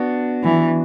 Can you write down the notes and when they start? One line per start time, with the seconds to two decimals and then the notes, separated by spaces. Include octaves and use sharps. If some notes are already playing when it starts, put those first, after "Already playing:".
Already playing: B3 D4 F#4
0.43 E3